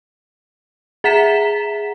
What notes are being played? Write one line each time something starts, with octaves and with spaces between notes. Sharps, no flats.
G#4 E5 F#5 A#5 B6 E7